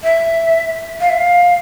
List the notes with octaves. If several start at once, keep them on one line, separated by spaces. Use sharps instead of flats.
E5
F5
E5
F5